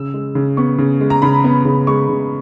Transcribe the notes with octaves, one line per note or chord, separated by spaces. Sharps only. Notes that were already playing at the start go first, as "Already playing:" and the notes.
Already playing: C#3 E6
G#3
C#3
B3 C#6
C#3
G#3
A#5
C#3 B5
B3
C#3
G#3 C#6
C#3